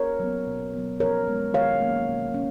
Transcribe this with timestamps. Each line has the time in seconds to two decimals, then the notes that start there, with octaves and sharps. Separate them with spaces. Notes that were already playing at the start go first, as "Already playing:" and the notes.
Already playing: A#4 C#5
0.20 F#3 B3
0.47 B2
0.74 F#3 B3
1.00 F3 A#4 C#5
1.27 G#3 B3
1.54 D#3 C#5 F5
1.81 F#3 A#3 C#4
2.08 B2
2.34 C#4